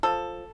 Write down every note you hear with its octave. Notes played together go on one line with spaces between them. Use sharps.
F3 A4